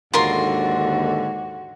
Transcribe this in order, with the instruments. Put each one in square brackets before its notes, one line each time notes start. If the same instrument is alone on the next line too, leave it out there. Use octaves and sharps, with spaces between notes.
[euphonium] D#2 [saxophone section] G#2 D3 [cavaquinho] F4 A#4 C6 [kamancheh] F#4